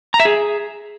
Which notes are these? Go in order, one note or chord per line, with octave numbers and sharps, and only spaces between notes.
A#5
E5
G#4